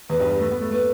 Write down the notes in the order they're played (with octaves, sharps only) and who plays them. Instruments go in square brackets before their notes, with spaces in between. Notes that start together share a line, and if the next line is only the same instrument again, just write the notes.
[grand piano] E2 [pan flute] B4
[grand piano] G2
G3
A3
B3
A3
[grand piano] A3 [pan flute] B4